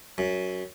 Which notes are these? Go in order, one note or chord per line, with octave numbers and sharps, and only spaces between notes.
F#2